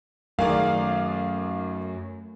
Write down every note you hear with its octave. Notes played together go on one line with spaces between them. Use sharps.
F#2 D#3 A3 G#4 A#4 D5 F5